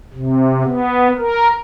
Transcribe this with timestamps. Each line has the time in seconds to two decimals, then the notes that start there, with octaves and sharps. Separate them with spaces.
0.14 C3
0.64 B3
1.18 A#4